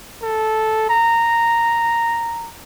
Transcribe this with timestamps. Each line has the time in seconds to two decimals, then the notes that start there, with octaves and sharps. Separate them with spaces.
0.22 A4
0.89 A#5